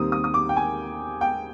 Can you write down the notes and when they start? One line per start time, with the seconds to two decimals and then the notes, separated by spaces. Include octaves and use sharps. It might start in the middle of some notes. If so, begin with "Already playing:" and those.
Already playing: D#2 D#3 G3 C4 D#6
0.12 D#6
0.24 D#6
0.34 D6
0.49 G5
0.56 G#5
1.21 G5